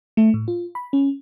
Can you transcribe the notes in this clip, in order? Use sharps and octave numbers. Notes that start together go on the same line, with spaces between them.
A3
A2
F4
B5
C#4